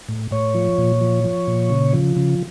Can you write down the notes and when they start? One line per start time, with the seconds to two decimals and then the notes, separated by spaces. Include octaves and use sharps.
0.09 A2
0.31 A2 C#5
0.55 F3
0.78 A#2
1.01 F3
1.24 F3
1.47 A#2
1.70 C#3
1.93 F3
2.17 C#3